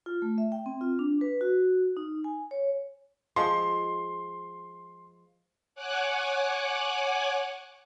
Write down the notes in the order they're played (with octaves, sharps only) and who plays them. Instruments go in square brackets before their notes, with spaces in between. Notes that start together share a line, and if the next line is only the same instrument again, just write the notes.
[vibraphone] F4
A3
E5
G5
C4
F4
D4
B4
F#4
D#4
G#5
C#5
[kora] F3 G#3 [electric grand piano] C6
[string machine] C#5 F#5 G#5 D6 F#6